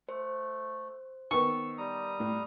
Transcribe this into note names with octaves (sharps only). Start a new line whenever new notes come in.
A3 C5
D#3 B3 C#6 E6
G3 A#5 D#6
A2